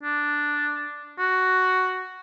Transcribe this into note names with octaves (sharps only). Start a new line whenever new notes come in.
D4
F#4